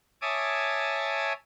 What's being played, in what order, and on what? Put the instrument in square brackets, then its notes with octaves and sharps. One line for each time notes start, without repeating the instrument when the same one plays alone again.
[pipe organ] C#5 E5 G#5 A5 D6 D#6